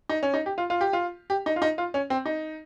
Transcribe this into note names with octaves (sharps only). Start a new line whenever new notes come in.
D#4
C#4
D#4
G4
F4
F4
G4
F4
G4
D#4
F4
D#4
F4
C#4
C4
D#4